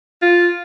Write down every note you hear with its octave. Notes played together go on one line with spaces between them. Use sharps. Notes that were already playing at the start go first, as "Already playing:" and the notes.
F4